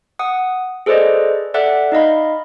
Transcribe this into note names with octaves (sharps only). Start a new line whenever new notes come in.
F#5 D#6
G#4 A4 B4 C5 D5 D#5
A4 D5 E5 F#5 F#6
D#4 D#5 F5 B5